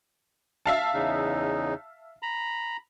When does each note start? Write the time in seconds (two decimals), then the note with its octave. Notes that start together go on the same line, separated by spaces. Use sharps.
0.66 E5 F5 A5
0.94 E2 C#3 D#4
2.23 A#5 B5